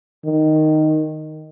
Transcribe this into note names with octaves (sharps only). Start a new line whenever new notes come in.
D#3